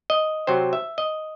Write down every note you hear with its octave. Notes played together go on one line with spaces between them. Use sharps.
D#5
C3 F#3 C4 C5
E5
D#5